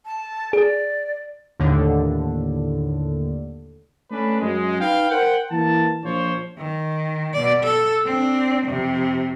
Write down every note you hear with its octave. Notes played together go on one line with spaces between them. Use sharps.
A5
G#4 D5
D#2 A2 D3
A3 C#4 D4 B4
F#2 G#3
D#4 B4 F5 G5
A#4 C5 F#5 G5
E3 A#3 A5
A#1 F3 C5 C#5
D#3
B2 D5
A4
C4 D4
F2 C3